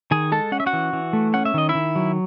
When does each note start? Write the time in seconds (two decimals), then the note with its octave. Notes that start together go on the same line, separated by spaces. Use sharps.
0.11 D#3 G#4 G#5
0.32 G#3 A4 A5
0.52 C#4 F#5
0.60 E5
0.66 F#4 F#5
0.73 E3
0.93 E3
1.13 A3
1.34 C#4 F#5
1.45 E5
1.54 D#3 D#5
1.69 E4 E5
1.75 D#3
1.96 F#3